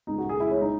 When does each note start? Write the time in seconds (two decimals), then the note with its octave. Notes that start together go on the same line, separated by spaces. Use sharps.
0.07 C#2 D#4
0.18 F#4
0.24 C#2
0.29 G#4
0.40 C#2 E4
0.51 C#4
0.56 G#3
0.61 D#4